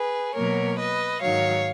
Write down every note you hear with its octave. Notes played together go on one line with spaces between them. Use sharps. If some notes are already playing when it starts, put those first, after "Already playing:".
Already playing: G#4 B4
B2 F#3 A#3 A#4 C#5
B4 D#5
G#2 D#3 F#3 C#5 F5